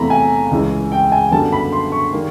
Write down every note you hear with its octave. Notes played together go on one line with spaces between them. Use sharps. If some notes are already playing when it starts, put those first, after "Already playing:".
Already playing: E2 C3 E3 A3 A#5 B5
G#5
C#2 C#3 E3 G#3
G5
G#5
F#2 D3 G3 B3 A5
B5
C6
C#6
D#3 G3 A#3